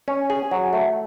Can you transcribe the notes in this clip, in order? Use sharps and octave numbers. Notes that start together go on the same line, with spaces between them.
C#4
G#4
F#3
A3